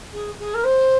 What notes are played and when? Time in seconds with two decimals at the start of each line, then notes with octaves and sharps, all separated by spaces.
0.13 G#4
0.39 G#4
0.54 A#4
0.64 C5